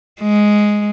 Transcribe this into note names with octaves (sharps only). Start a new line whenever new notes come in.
G#3